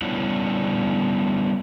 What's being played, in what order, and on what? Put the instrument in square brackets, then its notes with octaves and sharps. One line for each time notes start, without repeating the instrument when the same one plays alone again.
[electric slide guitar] G3 B3 C#4 D4 E4 F4